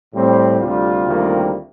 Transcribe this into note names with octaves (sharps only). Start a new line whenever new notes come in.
A2 G3 C4
D2 C3 G3 F4
D2 C3 D#3 G3 A#3